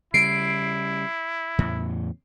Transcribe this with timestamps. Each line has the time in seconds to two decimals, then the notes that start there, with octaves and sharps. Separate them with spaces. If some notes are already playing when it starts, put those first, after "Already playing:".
0.14 C#3 G3 E4 C7 D7
1.58 E2 A2 C#3